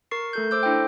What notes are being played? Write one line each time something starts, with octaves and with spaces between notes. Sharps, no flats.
A#4 C#6 A6 C7
A3 A4 G6
C5 D6 E6 G6
D4 E4 A4 C5 G5